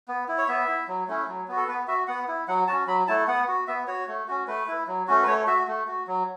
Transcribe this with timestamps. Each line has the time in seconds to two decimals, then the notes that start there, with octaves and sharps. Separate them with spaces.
0.08 B3
0.28 E4
0.38 C#5
0.48 B3 E5
0.68 E4
0.88 F#3
1.08 A3 C#4 E4
1.28 F#3
1.48 B3 F#4
1.57 A4
1.68 B3 B4
1.88 F#4 E5
2.08 B3 F#5
2.28 E4
2.48 F#3 F#5
2.68 C#4 F#4 A5
2.87 F#3 B5
3.08 A3 E4 A5
3.28 B3 F#5
3.48 F#4
3.68 B3 E5
3.87 F#4 C#5
4.07 A3
4.28 C#4 F#4
4.47 A3 B4
4.68 E4
4.87 F#3
5.07 A3 C#4 F#4
5.23 B4
5.28 A3 C#5
5.47 F#4 E5
5.68 A3
5.87 F#4
6.07 F#3